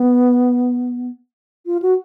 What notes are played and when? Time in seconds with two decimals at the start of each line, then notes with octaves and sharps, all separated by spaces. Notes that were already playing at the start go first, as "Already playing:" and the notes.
Already playing: B3
1.66 F4
1.82 F#4